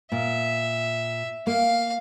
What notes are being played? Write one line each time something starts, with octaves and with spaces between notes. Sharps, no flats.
A#2 E5
A#3 F5